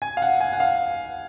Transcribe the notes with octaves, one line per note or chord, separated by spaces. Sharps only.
G#5
F5
F#5
G#5
F#5
F5